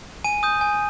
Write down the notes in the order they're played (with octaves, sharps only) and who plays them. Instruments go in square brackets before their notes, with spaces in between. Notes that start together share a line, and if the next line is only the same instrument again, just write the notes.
[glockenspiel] G#5 D#7
D#6 G6
G#5